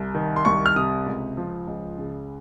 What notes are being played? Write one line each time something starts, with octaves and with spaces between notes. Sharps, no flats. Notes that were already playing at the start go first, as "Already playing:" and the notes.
Already playing: C2
D#3
C6
C2 C#6
F6
C3 D#6
C#2
F3
C#2
C#3